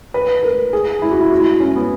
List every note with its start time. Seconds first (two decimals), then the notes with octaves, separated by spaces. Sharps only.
0.14 B4
0.43 A#4
0.73 G#4
1.02 E4
1.11 F#4
1.21 E4
1.31 F#4
1.40 E4
1.60 C#4
1.76 B3